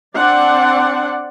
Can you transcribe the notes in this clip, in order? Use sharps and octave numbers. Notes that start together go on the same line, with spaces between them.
C4 D4 D5 F#5